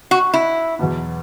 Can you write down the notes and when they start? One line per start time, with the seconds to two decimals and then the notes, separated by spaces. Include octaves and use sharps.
0.11 F#4
0.34 E4
0.79 E2 B2 F#3